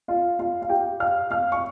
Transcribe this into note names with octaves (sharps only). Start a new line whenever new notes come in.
F4 F5
F4 F5
F5
G4 G5
F5 F6
F5 F6
C#6